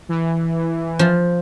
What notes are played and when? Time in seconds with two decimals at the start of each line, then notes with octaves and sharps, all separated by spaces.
0.09 E3
0.99 F3